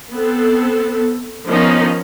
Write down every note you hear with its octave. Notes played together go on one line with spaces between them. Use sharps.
B3 C4 A4
D#3 F3 B3 C#4 D#4